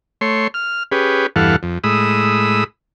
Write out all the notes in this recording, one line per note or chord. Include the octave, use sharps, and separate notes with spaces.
A3 C#5 C6
F6
C#4 G4 G#4 B4
E2 G2 E3 A4 F5 F#5
F2
A2 G#3 B5 D#6 E6